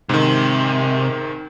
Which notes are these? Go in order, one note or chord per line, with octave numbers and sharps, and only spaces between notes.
G#2 C3 D#3